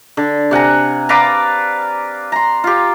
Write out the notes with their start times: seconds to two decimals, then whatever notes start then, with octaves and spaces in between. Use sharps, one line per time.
0.17 D3
0.51 C3 F#5 G#5 A#5
1.09 B4 D5 F5 A#5
2.32 A#5 C6
2.64 F4 G4